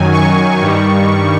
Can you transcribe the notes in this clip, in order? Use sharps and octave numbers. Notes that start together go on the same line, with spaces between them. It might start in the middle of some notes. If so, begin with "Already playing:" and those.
Already playing: F#2 D#3 F#3 G#5
C#6
G2 D#3 G3